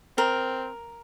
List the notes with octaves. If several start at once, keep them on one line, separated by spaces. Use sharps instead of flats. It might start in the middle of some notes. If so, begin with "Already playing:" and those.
C4 A#4